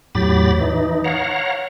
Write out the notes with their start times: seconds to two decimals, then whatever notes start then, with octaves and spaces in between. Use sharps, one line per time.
0.15 E2 A2 F#3 G4 B5 A6
0.60 E3 D#4
1.04 C#5 F5 F#5 A#5